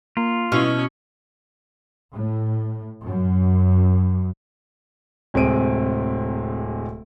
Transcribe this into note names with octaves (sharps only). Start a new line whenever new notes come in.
A#3 F4
B2 C#4 E4 F6
A2
F#2
D1 C3 G#3 C4 D7 D#7